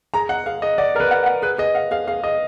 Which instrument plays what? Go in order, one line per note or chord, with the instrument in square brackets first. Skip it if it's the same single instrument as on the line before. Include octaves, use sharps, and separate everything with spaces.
[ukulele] G#4 [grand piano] A#5
[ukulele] D#5 [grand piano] F#5
[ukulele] G#4 [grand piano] F5
[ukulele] G#4 [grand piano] D#5
[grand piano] D5 [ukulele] F#5
[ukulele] G#4 [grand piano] A#4
[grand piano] B4
[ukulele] F#5
F#5
[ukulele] G#4 [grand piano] B4
[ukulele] G#4 [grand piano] D#5
[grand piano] F5 [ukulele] F#5
[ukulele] G#4 [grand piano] F5
[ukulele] G#4 [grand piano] F5
[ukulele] G#4 [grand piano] D#5